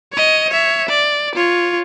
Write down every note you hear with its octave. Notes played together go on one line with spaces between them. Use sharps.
C#5 D#5
C#5 E5
D5
F4 C#5